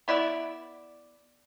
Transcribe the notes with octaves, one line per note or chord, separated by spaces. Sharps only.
B3 E4 D5 E5